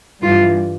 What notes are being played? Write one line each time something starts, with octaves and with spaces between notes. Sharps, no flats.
G2 E3 G3 F4